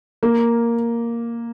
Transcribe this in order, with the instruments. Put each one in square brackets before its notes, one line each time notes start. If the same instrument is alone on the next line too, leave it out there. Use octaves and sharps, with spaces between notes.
[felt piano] A#3